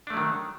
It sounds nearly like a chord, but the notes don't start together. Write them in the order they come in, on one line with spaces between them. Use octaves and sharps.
D4 A3 F#3 D#3